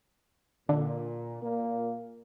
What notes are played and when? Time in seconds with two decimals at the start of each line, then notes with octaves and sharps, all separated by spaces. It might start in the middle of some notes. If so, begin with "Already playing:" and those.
0.69 A#2 D3
1.43 A#2 A#3